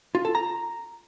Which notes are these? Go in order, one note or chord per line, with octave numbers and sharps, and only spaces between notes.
F4
A4
A#5